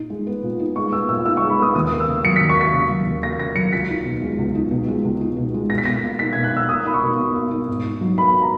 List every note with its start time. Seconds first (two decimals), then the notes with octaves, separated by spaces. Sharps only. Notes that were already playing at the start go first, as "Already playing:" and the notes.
Already playing: A#2 D#4
0.10 G#3
0.27 B3
0.43 A#2
0.59 D#4
0.76 G#3 C#6
0.92 B3 E6
1.09 A#2 E6
1.25 D#4 E6
1.37 G#3 C#6
1.50 B5
1.59 B3 D#6
1.75 D#2 D#6
1.91 A#3
2.00 E6
2.07 C#3
2.24 F#3 C#7
2.36 D#2 B6
2.49 C#6
2.57 A#3 B6
2.73 C#3
2.90 F#3
3.06 D#2
3.23 A#3 A#6
3.39 C#3 A#6
3.55 F#3 C#7
3.73 C#2 B6
3.89 D#4
4.06 B2
4.22 G#3
4.38 C#2
4.55 D#4
4.71 B2
4.88 G#3
5.04 C#2
5.21 D#4
5.37 B2
5.54 G#3
5.70 B2 A#6
5.78 B6
5.85 B2 A#6
6.03 A#3
6.19 D#4 B6
6.33 B2 G#6
6.44 F#6
6.53 B2 E6
6.69 A#3 D#6
6.86 D#4 B5
6.94 C#6
7.02 B2
7.19 B2
7.35 A#3
7.51 D#4
7.68 G#2
7.84 D#4
8.01 F#3
8.18 B3 B5
8.42 A#5